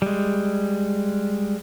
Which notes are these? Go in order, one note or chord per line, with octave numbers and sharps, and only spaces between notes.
G3 G#3